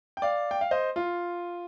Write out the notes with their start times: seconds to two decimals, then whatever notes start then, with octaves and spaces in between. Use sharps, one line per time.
0.17 G5
0.22 D5 F5
0.51 G5
0.61 F5
0.71 C5 D#5
0.96 F4